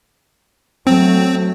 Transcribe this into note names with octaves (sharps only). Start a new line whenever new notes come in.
F#3 A3 C4